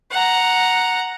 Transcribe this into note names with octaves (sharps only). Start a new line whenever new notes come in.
F#5 A#5